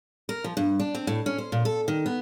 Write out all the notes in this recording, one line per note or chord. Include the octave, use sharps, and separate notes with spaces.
A#4
F3
G2
D4
C4
A2
C#4
C5
A#2
A4
D#3
B3